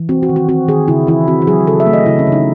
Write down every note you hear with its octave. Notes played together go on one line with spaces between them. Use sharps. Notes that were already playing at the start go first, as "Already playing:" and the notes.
Already playing: E3
C4 F#4
F#4
D#3
F#4
C4 F#4
D#3 G#4
C#3 E4
E3 E4
C4 F#4
F#4
F#3 G#4
C#3 A4
E5
A3
D#5
C#3 E4
C#4
C#3
D#4